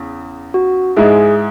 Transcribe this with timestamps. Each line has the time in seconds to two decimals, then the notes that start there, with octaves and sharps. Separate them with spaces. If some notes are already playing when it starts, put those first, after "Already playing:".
Already playing: E2 C#3
0.54 F#4
0.96 G#2 G#3 E4 G#4